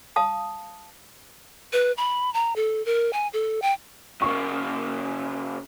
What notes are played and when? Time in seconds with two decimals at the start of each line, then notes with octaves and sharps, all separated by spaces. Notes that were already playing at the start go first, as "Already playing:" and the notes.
0.16 F5 A5 D#6
1.73 B4
1.98 B5
2.34 A#5
2.56 A4
2.86 A#4
3.13 G#5
3.33 A4
3.62 G5
4.22 C#3 A#3 C#6